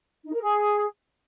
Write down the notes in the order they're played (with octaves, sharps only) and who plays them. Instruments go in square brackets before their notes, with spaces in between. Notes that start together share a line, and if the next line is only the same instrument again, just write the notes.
[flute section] D#4
A#4
G#4